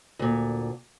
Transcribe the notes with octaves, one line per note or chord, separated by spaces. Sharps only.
D2 A#2